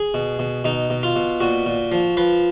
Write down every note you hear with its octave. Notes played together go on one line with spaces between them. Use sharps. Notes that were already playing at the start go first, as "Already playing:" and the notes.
Already playing: G#4
B2
B2
B2 D#4
B2
F4
B2
A#2 F#4
A#2
F3
F3 B4